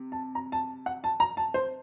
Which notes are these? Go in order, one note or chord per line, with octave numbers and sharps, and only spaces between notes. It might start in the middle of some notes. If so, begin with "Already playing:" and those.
Already playing: C3
A5
A#5
A5
F#5
A5
A#5
A5
C5